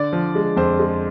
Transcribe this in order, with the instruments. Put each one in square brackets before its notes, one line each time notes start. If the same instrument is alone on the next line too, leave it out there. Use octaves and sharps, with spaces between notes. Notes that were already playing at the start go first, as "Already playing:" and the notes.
Already playing: [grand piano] D3 D5
F3
G#3
F2 C5
G#3